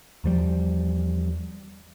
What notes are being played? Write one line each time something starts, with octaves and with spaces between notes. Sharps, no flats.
E2 F3 G3